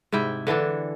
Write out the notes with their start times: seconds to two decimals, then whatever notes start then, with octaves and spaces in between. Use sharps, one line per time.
0.12 G#2 C3 E4 G5
0.47 D3 E3 D4 A4